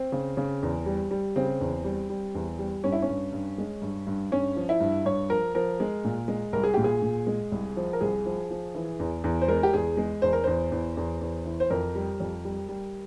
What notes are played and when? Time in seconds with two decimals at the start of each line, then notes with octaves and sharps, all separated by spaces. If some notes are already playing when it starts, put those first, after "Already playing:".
Already playing: C4
0.12 C#3
0.37 C#3
0.63 E2
0.86 G3
1.11 G3
1.36 C#3 C4
1.60 E2
1.85 G3
2.10 G3
2.35 E2
2.59 G3
2.84 G2 C#4
2.92 E4
3.02 C#4
3.08 G2
3.33 G2
3.58 G#3
3.82 G2
4.07 G2
4.31 G2 C#4
4.56 F3
4.69 E4
4.80 G2
5.05 G2 C#5
5.30 F3 A#4
5.55 F3 A#4
5.80 G#3
6.04 A#2
6.28 G#3
6.53 C2 A#4
6.64 G#4
6.74 A#2 G4
6.84 G#4
7.02 A#2
7.27 G#3
7.52 C2
7.77 F3
7.93 A#4
8.01 C2 G#4
8.26 F3
8.51 F3
8.75 E3
9.00 E2
9.24 E2
9.42 C5
9.48 G#3 A#4
9.63 G4
9.73 E2 G#4
9.97 G#3
10.22 E2 C5
10.33 A#4
10.44 E2 C5
10.72 E2
10.97 E2
11.21 E2
11.45 E3
11.60 C5
11.70 F2 A#4
11.95 G3
12.20 F2
12.45 G3
12.69 G3